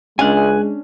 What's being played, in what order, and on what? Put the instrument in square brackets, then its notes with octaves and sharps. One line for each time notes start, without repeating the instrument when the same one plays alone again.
[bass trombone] C#2 [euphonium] G#3 [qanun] C#4 D4 [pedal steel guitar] G#5 F#6